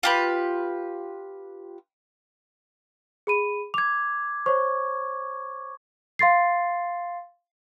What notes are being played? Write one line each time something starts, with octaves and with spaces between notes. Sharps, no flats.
F4 G4 B4
G#4 B5 D#7
D6 G#6 F7
C5 C#5 C#6
F5 C6 A6 C7